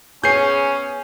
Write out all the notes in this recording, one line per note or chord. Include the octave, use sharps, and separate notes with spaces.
B3 C#4 G#4 C#5 G6 C7